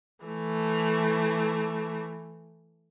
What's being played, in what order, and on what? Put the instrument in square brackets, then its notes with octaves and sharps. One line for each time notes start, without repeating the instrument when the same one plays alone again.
[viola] E3 A3